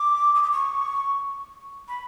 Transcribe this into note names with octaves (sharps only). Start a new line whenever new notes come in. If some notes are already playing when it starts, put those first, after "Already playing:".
Already playing: D6
D#6
D6
C#6
B5